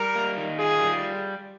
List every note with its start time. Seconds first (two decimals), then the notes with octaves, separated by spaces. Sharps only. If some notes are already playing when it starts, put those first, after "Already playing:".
Already playing: G3 A#4
0.15 A#3
0.37 D#3
0.59 F4 G#4
0.81 G3